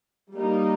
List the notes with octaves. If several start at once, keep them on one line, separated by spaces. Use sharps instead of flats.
G3 A#3 D#4